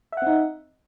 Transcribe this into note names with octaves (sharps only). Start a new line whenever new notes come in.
C4 D#4 E5 F#5